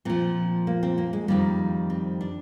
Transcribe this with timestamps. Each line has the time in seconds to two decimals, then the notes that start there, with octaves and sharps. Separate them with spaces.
0.05 A#2 F3 C4
0.67 A#3
0.83 C4
0.98 A#3
1.13 G#3
1.28 F2 D#3 G3 A#3
1.90 C4
2.21 D4